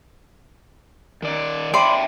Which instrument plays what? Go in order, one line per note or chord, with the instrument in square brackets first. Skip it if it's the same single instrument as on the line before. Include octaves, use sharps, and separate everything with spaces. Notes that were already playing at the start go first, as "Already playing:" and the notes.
[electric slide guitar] D#3 D5
[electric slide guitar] D4 E5 G5 [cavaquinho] D5 B5 C6